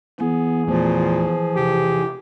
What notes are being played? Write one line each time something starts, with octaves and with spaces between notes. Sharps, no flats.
E3 B3 G#4
E2 A#2 F3 A3 B3
E1 C3 G4